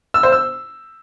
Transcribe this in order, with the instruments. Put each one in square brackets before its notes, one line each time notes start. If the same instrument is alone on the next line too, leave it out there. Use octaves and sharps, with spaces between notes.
[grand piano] E6
C5
E6